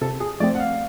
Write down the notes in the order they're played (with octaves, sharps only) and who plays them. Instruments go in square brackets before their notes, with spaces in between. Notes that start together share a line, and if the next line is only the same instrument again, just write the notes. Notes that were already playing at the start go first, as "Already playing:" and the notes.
[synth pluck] C3 [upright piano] A4
[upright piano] G#4
[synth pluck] F3 A3 C4 [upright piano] D5
[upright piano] F#5
F5